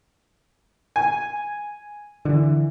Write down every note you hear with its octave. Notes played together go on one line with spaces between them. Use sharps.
G#5
D3 E3